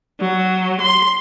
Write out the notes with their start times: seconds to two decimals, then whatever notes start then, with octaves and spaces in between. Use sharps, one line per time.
0.20 F#3
0.80 C6